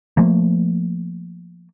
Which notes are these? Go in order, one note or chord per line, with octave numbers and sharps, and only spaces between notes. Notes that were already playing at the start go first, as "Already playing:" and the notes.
F3 A3 A#3